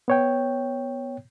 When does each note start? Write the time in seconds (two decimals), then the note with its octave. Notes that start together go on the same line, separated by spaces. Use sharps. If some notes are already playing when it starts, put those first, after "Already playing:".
0.08 B3 C#5 G5